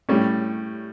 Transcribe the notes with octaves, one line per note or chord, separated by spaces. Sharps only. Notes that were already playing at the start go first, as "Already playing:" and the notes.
A2 G3 C#4